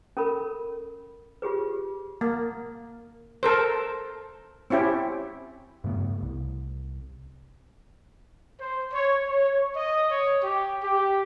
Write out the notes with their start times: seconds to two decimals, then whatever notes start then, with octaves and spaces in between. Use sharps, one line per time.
0.17 C#4 A4 A#4 B5
1.42 F4 G4 G#4 B4
2.21 A#3
3.43 A4 A#4 C5
4.70 C4 C#4 E4 G4
5.84 G2 C#3 A3 B3
6.22 C2
8.61 C5
8.93 C#5
9.28 C#5
9.76 D#5
10.11 C#5
10.43 G4
10.83 G4